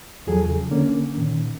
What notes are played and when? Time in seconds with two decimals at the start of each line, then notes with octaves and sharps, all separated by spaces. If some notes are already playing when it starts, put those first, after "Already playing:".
0.27 E2 F3 F#3 G#4 A4
0.46 C#3
0.71 D3 A#3 C#4
1.18 A#2 D#3